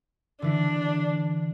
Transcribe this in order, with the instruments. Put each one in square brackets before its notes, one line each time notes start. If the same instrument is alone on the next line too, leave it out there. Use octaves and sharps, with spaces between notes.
[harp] D3 E3 E4 [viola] D4